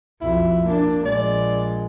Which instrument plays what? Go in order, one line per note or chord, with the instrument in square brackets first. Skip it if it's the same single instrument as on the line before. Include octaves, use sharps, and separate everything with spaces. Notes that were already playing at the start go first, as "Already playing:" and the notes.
[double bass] B1 F2 [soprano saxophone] E4
[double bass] A#3 D4
[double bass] A#1 G#3 [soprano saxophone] D5